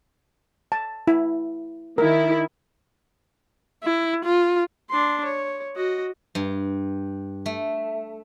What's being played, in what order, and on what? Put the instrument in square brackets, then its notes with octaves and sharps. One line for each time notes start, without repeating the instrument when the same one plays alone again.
[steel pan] A5
E4
[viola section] D#3 E4 [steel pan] A#4
[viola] E4
F4
[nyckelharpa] D4 C6
C#5
F#4 D#5
[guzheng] G2
A3